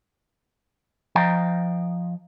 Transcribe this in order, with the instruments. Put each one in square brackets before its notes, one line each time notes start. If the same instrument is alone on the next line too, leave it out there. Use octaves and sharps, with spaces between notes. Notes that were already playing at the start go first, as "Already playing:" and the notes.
[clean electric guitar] F3 D#5 F5 G5 A#5